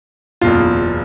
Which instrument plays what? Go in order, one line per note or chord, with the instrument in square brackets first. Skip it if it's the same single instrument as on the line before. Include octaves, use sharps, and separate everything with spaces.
[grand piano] F#1 E2 B2 [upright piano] F4